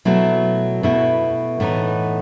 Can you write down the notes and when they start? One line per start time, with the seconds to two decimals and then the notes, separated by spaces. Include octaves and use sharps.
0.05 B2 F#3 A3 E4
0.83 B2 A3 E4
1.60 A2 E3 B3 D#4